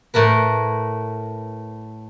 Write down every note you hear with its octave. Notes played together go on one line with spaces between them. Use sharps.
A2 E4 A#4 B4